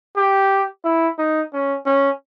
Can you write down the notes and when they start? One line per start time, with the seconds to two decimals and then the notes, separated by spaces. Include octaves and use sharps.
0.17 G4
0.85 E4
1.18 D#4
1.53 C#4
1.86 C#4